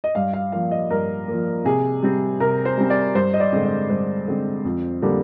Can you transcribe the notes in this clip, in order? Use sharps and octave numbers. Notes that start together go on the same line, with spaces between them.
D#5
G2 F5
F5
F3 A#3 F5
D#5
G2 A#4
F3 A#3
C3 G#4
G3 C4
C3 A#4
C5
G3 C4
D5
G2 C5
D#5
D5
D3 G#3 C4
D#5
G2 C5
D3 G#3 C4
F2
D3 G3 A#3 D4